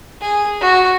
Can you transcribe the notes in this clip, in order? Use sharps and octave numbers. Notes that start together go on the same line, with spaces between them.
G#4
F#4